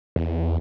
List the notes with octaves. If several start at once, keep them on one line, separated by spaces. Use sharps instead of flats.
E2